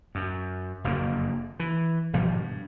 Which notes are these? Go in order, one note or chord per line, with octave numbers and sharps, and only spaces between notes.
F#2
F#1 F2 D3 A#3
E3
G#1 B2 F3 G3
G2